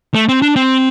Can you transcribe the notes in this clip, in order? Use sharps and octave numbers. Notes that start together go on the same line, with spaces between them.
A3
C4
D4
C4